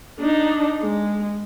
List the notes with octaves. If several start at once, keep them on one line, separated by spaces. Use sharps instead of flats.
D4 D#4
G#3